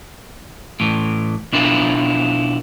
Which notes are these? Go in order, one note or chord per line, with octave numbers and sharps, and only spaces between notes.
A2 E3
B2 D4 E4 F4 A#4